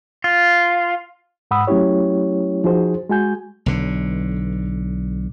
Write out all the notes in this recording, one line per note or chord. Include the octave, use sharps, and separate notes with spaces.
F4
G#2 F#5 B5 D#6 E6
F#3 A3 C#4 E4 G4 C#5
F3 D#4 F#4 G#4 C5
G#3 F#4 G#5 G6
B1 D3